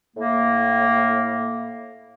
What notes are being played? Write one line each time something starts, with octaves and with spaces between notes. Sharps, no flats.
A2 A#3